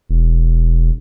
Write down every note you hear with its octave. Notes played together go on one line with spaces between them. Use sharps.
E1